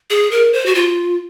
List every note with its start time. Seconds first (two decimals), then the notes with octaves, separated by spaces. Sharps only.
0.10 G#4
0.31 A#4
0.53 C5
0.66 F#4
0.75 F4